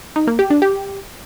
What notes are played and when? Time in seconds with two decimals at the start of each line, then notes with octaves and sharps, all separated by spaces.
0.16 D#4
0.27 A#3
0.39 G4
0.50 D4
0.62 G4